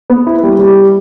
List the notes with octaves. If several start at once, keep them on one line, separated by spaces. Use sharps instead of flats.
B3
E4
G3
G3